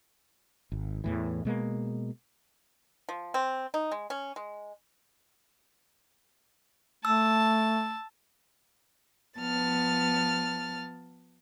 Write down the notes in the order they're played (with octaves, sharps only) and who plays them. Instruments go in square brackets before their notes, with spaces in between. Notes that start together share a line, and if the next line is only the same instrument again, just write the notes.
[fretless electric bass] G#1
E2 A2 E3
B2 G#3 A#3
[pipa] F3
C4
D#4
G#3
C#4
G#3
[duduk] A3 [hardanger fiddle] A5 [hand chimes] E6
[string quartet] F3 B3 A5 F6 A6